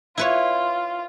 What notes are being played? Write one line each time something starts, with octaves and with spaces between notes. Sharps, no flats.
E4 F4 B4 C#5